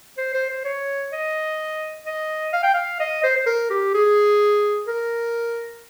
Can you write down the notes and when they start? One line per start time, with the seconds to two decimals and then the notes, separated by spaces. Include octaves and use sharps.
0.18 C5
0.34 C5
0.50 C5
0.65 C#5
1.13 D#5
2.06 D#5
2.53 F5
2.63 G5
2.74 F5
3.00 D#5
3.24 C5
3.36 C5
3.46 A#4
3.70 G4
3.94 G#4
4.87 A#4